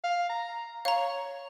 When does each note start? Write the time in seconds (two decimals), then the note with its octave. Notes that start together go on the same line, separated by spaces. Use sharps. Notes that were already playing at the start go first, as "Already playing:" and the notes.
0.04 F5
0.29 A#5
0.85 C#5 F5 A#5